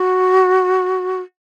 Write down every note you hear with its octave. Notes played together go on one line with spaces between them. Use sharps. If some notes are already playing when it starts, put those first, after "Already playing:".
Already playing: F#4